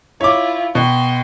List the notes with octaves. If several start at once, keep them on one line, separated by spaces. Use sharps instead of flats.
E4 F4 C#5 D6
B2 G5 C6